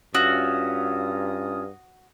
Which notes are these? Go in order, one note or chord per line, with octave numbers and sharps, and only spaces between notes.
G2 C#4 F4 F#4 E5 D#6